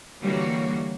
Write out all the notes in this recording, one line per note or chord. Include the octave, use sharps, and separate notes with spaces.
D3 E3 G3 A#3 F#4 C#5